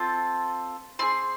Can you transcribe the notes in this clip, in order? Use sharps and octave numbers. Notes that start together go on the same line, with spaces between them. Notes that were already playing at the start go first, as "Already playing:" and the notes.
Already playing: C4 F4 A4
C4 F4 G#4 C6